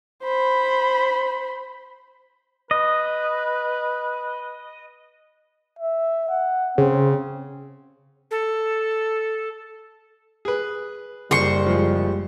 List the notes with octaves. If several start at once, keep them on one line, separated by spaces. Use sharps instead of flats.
C5 B5
B4 D#5
E5
F#5
C#3 C4
A4
G#4 B4
F#1 G3 C5 C6 C#6
F3 G#3